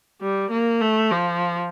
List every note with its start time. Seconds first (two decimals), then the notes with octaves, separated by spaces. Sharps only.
0.21 G3
0.51 A#3
0.81 A3
1.11 F3